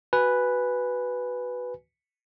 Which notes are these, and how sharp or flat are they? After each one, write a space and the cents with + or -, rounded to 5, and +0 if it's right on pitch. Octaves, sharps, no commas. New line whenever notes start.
F#4 +10 B4 +0 G#5 +0